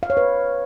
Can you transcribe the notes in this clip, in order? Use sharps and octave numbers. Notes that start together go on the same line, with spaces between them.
F5
C#5
B4